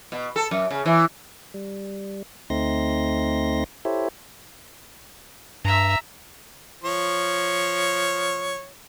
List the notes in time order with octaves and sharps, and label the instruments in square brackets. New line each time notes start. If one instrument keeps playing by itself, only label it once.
[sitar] B2
A4
F#2
C#3
E3
[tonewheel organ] G3
D2 A3 C4 D#4 C6 A#6
E4 G4 A4 C5 C#5 E5
[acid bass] G2 [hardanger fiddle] E5 A#5
[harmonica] F3 C#5